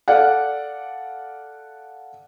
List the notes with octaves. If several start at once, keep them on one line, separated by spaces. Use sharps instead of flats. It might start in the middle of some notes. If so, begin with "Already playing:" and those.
A4 D5 F5 F#5